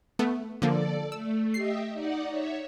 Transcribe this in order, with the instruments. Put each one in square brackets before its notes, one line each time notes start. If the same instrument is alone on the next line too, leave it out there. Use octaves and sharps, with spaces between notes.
[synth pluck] A3 B3
[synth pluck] D3 F3 A#3 [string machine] A4 D5
[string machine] A3 [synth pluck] E6
[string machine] G4 D#5 E5 [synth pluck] C7
[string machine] D#4 D5 F#5
C#5 E5